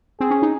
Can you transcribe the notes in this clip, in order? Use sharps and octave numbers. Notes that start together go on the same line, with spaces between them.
C4 G#4
C#4
D#4